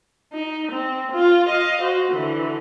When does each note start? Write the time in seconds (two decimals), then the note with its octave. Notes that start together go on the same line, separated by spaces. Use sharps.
0.33 D#4
0.72 C4
1.12 F4
1.48 D#5 F5
1.82 F#4 C5
2.12 D3 E3